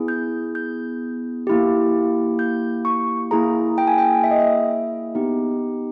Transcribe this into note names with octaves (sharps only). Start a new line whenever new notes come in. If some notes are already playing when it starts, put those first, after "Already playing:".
Already playing: B3 E4 G#4
G6
G6
A#3 E4 G4
G6
C#6
A#3 E4 G#4 A#5
G5
G#5
G5
E5
D#5
E5
B3 D#4 G4